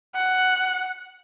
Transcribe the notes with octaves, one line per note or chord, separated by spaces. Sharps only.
F#5